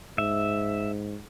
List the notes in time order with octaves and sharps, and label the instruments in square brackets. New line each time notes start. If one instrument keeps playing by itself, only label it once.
[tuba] G#2 [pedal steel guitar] E5